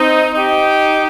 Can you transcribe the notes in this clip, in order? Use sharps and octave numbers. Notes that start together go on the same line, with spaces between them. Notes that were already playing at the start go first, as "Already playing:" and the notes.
Already playing: C4 D#4
D#4 G4